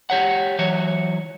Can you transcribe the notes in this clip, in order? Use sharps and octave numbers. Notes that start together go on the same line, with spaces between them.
G4 C#5 F#5
E3 F#3 C#5